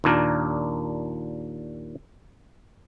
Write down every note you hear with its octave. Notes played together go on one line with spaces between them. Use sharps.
D#2 A#2 D4 A#4